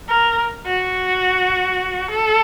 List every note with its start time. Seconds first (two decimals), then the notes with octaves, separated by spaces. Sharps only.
0.09 A#4
0.66 F#4
2.11 A4